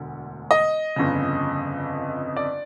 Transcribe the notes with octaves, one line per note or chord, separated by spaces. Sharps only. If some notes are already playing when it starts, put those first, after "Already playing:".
Already playing: E1 D2 D3
D#5
G1 F2 C#3
D5